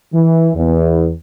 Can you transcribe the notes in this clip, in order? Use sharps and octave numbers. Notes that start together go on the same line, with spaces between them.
E3
E2